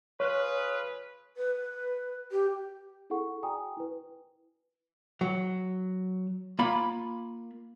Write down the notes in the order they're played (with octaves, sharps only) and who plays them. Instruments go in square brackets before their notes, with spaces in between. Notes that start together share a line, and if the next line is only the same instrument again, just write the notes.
[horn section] F4 G#4 B4 [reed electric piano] C#5
[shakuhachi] B4
G4
[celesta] E4 G#4 A4 F#5 C#6
F#4 D5 G5 G#5 A#5 D#6
E4 B4
[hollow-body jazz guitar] F#3
A#3 F4 B5